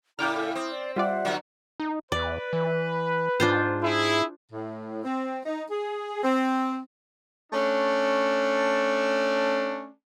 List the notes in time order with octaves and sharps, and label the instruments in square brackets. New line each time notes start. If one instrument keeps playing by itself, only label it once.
[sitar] A2 C#3 [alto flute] E4 [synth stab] G5 D6 F6 [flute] A#5
[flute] A4
[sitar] C4 [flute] D#6
[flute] D5
[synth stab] G3 F4 D5 [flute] E5 [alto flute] F#5
[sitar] D3 F#3 F#4
[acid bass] D#4
[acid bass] E2 [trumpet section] B4 [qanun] D5
[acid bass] E3
[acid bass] G#2 [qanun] D4 F4 C5
[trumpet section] E4 G#4
[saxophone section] A2
C4
D#4
G#4
C4
[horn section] A3 C#4 D4